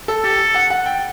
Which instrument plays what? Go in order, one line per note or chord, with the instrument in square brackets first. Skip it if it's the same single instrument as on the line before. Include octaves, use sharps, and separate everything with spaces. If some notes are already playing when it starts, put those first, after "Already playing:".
[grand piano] A4
[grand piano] G4 [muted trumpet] A4
[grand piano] F#5
F#5
G5